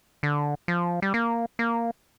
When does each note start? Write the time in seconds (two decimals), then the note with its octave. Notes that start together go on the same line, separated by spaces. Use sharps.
0.23 D3
0.68 F3
1.02 G3
1.14 A#3
1.59 A#3